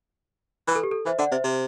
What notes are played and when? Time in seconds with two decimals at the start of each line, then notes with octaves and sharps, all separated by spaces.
0.67 E3 B4
0.75 A4
0.83 G4
0.91 A4
1.06 E3 C5 E5
1.19 D3 D5 F#5
1.31 C3 C5 E5
1.44 C3